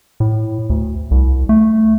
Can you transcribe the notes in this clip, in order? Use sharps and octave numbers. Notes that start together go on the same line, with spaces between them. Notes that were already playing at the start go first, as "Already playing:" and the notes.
A2
D2
C2
A3